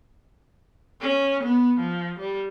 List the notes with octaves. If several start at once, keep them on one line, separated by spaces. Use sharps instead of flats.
C#4
B3
F3
G3